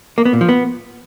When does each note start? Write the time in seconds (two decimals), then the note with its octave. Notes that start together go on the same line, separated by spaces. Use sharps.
0.18 A#3
0.25 B3
0.33 A#2
0.41 F3
0.49 B3